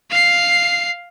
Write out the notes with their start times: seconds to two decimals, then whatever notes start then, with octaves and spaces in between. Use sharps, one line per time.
0.11 F5 C7